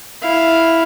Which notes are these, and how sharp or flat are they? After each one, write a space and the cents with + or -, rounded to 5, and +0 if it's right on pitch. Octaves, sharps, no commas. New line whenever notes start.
E4 +0 F5 +0